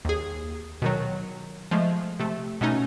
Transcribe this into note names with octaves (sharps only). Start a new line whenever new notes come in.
D#2 G#4
B2 D#3 F#3
F3 G#3 A3
C3 A3
B2 A3 C#4 D#4